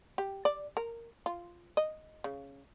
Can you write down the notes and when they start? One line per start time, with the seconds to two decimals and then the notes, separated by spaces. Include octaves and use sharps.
0.18 G4
0.45 D5
0.77 A#4
1.26 F4
1.77 D#5
2.24 C#3